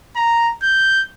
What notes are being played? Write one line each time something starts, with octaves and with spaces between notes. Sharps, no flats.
A#5
G6